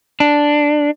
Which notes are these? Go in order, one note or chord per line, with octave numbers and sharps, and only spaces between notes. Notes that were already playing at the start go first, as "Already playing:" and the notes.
D4